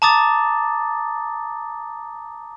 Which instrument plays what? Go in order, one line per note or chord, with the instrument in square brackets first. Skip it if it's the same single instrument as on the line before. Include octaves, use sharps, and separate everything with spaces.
[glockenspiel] A5 A#5 D6 D#6 A6